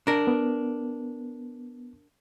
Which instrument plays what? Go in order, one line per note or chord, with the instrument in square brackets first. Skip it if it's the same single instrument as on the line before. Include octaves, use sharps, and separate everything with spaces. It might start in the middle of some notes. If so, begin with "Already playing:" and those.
[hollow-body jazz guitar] D4 A#4
[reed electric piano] B3